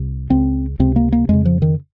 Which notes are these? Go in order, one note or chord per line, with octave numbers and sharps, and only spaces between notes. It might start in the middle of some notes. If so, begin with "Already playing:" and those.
Already playing: C2 C3
C#2 C#3 C4
C#2 C3 C4
A#3
A#3
F2 C#3 G#3
F3
D#3